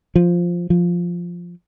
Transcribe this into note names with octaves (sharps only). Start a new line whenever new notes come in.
F3
F3